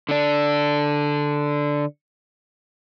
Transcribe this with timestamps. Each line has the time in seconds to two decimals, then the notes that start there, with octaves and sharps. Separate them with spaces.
0.09 D3 D4